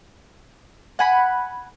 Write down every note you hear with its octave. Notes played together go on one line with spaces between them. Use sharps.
F#5 G#5 B5